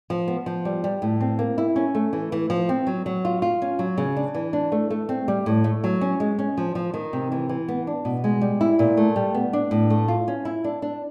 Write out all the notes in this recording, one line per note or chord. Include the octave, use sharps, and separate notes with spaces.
F3
B3
F3
G3
G3
A2
C4
A#3
E4
C#4
A3
E3
E3
F3
C4
F#3
F#3
F4
F4
C#4
F#3
C#3
D4
E3
D4
A3
A3
C4
G3
A2
A3
F#3
C#4
G#3
C#4
F3
F3
D#3
C3
E3
E3
B3
D4
B2
G#3
G3
E4
A#2
A3
G3
B3
D4
A2
A3
F4
C#4
E4
D4
D4